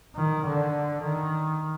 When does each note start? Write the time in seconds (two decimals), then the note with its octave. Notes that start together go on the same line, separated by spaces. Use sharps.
0.16 D#3
0.45 D3
1.03 D#3